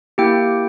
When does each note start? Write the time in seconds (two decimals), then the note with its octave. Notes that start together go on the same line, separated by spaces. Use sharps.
0.18 A#3 E4 G4 G5